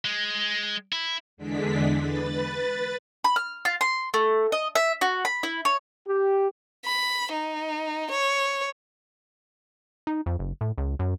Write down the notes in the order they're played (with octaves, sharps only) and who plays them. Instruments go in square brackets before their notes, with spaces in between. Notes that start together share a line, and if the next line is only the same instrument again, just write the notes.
[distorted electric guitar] G#3
E4
[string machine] E2 D3 G#3 D4 B6
B4 A6
[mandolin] B5
F6
F4
C6
A3
D#5
E5
F#4
B5
E4
C#5
[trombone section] G4
[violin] B5
D#4
C#5
[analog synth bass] D#4
F2
F#1
A2
C#2
F#2